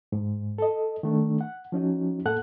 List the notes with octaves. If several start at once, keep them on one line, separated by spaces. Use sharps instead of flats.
G#2
A4 D#5
D#3 A3 D4
F#5
F3 C#4 D#4 F#4
A2 A#3 A4 F#5 F#6